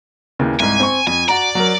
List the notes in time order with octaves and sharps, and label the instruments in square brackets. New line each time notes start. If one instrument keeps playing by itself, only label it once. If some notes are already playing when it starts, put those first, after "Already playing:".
[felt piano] D#2 C#3 E3
[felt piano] C2 G#2 [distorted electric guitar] G#5
[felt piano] C4 C#6
[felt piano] F2 [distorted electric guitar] G#5
[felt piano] F#4 A#5 [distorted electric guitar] D5
[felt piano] F#3 A#4